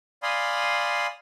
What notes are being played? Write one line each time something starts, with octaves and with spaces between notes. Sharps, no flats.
D5 F5 G#5 B5 C6 D#6